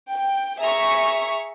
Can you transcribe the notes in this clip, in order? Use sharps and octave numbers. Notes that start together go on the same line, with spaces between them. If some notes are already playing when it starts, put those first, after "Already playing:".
G5
G#4 E5 A#5 C#6